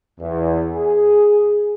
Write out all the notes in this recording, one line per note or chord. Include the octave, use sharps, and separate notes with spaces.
E2
G#4